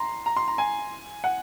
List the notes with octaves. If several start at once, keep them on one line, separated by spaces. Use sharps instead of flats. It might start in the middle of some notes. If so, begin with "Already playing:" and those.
Already playing: A#5 C6
A#5
C6
A#5
G#5
F#5